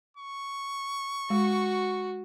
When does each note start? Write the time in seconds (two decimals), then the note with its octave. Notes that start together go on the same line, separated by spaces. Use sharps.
0.17 C#6
1.30 G#3 F#4